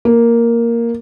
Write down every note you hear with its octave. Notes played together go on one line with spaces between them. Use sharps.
A#3